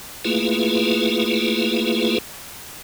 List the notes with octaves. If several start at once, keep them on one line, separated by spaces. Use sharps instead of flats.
A3 A#3 E4 F4 G#4 B4